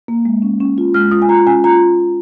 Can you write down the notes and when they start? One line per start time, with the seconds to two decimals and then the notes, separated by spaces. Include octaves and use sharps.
0.08 A#3
0.25 G#3
0.42 C#4
0.60 C#4
0.78 F4
0.94 G#3 F6
1.11 F4 D#6
1.22 G#5
1.29 F4 A#5
1.47 C#4 G#5
1.64 F4 A#5